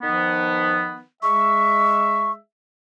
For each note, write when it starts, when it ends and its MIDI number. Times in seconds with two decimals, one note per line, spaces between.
0.01 1.01 51
0.01 1.01 53
0.01 1.01 59
1.23 2.37 56
1.23 2.37 76
1.23 2.32 85